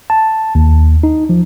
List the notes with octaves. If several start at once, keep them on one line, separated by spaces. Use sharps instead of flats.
A5
D#2
D#4
F3